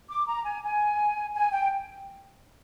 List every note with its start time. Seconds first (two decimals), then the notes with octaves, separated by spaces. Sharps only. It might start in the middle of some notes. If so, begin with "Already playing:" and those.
0.09 D6
0.27 A#5
0.45 G#5
0.63 G#5
1.33 G#5
1.52 G5